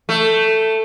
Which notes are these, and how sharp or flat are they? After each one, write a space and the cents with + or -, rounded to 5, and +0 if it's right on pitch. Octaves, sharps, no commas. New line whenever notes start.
A3 +5